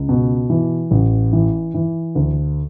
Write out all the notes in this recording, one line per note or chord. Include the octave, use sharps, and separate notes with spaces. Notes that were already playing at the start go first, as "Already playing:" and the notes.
Already playing: C#2
B2
E3
A1
E3
E3
D2